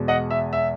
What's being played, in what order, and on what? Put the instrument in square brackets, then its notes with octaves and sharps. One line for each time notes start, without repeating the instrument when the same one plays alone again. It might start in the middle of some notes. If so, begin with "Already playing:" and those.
Already playing: [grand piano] E2 B2 G#3
D#5 F#5
E5
E5